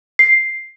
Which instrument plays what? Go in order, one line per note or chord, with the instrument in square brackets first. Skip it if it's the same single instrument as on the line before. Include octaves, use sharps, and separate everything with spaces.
[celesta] C7